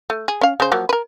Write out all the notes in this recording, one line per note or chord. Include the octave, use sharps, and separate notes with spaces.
A3
G#4
C#4 F5
C#3 C5
F3 F#3 A#3
A#4 B4